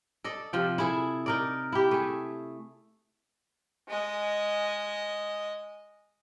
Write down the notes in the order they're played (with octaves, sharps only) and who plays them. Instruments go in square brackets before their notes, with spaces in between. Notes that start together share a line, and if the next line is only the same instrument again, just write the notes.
[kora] A4 D5 D#5
C3 F3 G5
E4 G#4 A4
D#4 A#4 D5
E4 G4
A3 G#4
[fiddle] G#3 D#5